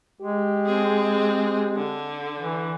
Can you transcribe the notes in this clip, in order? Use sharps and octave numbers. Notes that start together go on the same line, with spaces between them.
G#3 G4
C4 G#4
D3
E3